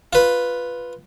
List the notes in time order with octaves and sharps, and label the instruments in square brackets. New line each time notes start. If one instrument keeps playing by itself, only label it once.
[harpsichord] F4 B4